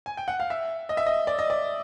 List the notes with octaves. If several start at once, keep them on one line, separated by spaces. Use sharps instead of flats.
G#5
G5
F#5
F5
E5
D#5
E5
D#5
D5
D#5
D5